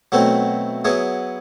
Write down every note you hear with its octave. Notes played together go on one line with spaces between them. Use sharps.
B2 F#3 A3 C4 E4
F#3 B3 E4 G#4